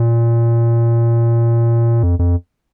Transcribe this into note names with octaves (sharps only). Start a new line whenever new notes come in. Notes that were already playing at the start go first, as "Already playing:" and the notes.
Already playing: A#2
F2
F2